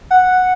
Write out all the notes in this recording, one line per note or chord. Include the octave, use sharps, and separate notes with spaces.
F#5